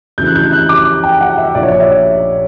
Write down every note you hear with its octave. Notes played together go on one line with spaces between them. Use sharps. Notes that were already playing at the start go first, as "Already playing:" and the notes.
D2 C#3 E3 G6
F#6
G6
F#6
D6
G5
F#5
E5
A#1 A#2 D5
C#5
D5
E5